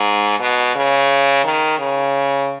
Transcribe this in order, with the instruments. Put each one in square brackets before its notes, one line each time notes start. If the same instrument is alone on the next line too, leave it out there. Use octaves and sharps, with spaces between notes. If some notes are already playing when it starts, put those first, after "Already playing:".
Already playing: [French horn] G#2
B2
C#3
D#3
C#3